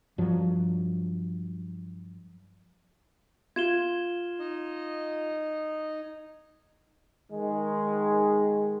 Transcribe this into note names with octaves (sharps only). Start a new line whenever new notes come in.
G2 F3 F#3
F4 G#6 E7 G7
D#4 D#5
D#3 G#3